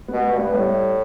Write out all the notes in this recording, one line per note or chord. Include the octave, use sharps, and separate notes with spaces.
B2 B3
B3
G2
B3
A2 G3